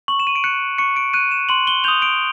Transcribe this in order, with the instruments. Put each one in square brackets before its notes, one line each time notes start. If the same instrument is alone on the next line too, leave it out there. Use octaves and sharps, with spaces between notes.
[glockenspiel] C#6 F#7
E7
D#7
D7
F#6 C#7
C#6 C#7
D7
F#6 D#7
E7
C6 F#7
G7
D#6 G6 F7
D7